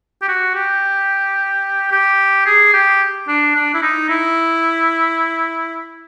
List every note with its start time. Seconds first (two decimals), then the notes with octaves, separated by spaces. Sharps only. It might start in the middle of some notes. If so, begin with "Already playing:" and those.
0.22 G4
0.28 F#4
0.55 G4
1.91 G4
2.46 G#4
2.74 G4
3.28 D4
3.56 D4
3.74 E4
3.82 D#4
4.09 E4